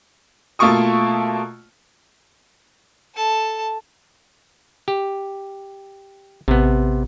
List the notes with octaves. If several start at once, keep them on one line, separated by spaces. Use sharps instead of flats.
B2 A3 A#3 F4 C#6 D#6
A4 A5
G4
A1 C3 B3